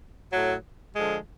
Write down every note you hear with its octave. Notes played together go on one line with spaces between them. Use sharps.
A2 F#3
D3 F3 G#3